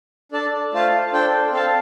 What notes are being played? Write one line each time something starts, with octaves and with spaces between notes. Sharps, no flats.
D4 A4 D5 A5
A3 F4 C5 F5 A5
D4 A4 C5 G5
C4 A4 F5 A5